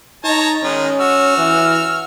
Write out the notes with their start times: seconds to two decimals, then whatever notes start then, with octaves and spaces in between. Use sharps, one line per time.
0.24 D#4 C#5 A5 A#5
0.63 D#3 G#3 C#4
1.00 F#4 E6 F6
1.38 E3